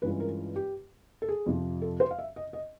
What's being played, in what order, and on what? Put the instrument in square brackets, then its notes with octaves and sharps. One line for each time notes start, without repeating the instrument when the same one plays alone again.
[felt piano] G2 E3 G#3 C#4 F4 B4
A#4
G4
A4
G#4
F2 C3 F3
A4
C5
F5
E5
D#5
D#5